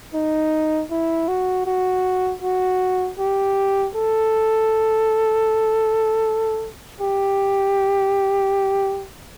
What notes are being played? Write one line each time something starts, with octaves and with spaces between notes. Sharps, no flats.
D#4
E4
F#4
F#4
F#4
G4
A4
G4